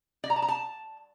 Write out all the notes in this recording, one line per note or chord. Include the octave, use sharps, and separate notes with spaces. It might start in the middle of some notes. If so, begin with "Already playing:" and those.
D5
A#5
A5
A#5
A5